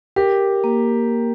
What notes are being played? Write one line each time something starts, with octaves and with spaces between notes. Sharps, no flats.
G4 A#4
A#3